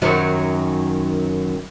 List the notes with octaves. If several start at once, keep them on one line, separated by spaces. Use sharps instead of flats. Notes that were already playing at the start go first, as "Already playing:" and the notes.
F#2 D#3 F#3